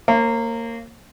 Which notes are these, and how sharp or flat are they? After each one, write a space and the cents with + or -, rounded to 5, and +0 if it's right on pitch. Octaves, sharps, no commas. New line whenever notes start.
A#3 -20 C#5 -45